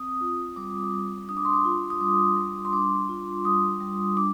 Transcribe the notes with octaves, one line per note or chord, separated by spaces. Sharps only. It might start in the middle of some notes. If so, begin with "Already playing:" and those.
Already playing: C4 D#6
F4
G3 D6
G3
D4 D#6
D6
C6
D6
F4
D#6
G3 D6
G3
C6
D4 D6
F4
G3 D#6
G3
D4 D6